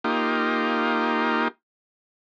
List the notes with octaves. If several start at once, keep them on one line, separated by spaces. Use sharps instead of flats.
A#3 D#4 F4 G4